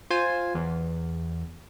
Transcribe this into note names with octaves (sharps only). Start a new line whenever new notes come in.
F4 C5 G#5
E2